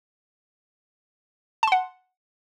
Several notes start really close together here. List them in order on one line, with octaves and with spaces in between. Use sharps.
A5 C6 F#5